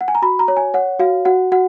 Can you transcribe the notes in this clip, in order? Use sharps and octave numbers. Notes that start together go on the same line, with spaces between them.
F#5
G#5
A#5
F#4 B5
A#5
C#5
G#5
C#5 F#5
F#4 F5
F#4 F#5
F#4 F#5